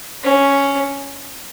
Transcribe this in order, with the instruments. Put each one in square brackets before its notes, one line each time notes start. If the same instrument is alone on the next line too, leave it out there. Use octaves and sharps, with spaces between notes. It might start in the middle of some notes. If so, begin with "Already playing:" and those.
[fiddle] C#4